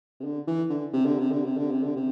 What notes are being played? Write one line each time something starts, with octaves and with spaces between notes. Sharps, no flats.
C3
D3
E3
D3
C3
D3
C3
D3
C3
D3
C3
D3
C3